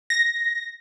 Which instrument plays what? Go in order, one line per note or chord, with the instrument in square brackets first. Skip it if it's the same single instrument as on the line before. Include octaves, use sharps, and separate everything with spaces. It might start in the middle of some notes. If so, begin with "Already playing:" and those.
[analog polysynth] A#6